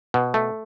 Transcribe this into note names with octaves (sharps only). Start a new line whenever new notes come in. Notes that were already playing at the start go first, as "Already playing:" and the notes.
B2
A3